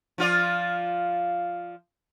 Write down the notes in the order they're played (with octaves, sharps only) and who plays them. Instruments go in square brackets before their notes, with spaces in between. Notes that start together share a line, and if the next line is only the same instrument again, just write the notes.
[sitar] F3 F4 D5